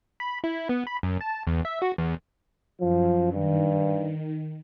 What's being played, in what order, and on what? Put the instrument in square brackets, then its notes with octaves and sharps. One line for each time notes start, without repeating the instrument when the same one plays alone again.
[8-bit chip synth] B5
E4
B3
B5
F#2
A5
E2
E5
F#4
E2
[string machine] F#2 [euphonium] F3
[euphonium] G2 [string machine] D#3